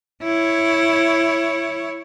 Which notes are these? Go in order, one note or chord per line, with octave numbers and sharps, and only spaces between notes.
E4 C#5